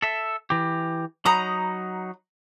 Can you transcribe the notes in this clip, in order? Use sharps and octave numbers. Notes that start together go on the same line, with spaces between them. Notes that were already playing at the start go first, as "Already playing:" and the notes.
A4 E5
E3 G4
F#3 D#4 A#5 B5 D#6